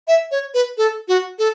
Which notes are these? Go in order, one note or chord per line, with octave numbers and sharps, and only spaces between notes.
E5
C#5
B4
A4
F#4
A4